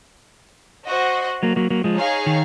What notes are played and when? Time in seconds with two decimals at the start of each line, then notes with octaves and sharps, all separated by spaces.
0.88 F#4 C5 D#5 F#5
1.43 F#3 A#3
1.56 F#3 A#3
1.70 F#3 A#3
1.84 F3 G#3
1.98 D#4 G#4 C#5 F5 G#5
2.26 D#3